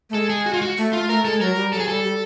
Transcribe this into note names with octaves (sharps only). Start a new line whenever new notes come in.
A3
G#3 A4
G#4
F#4
F4
F#4
A3
F4
A3 A#4
G#3 A4
F#3 A#4
G3
F#3 A4
G#4
G3 A4
G3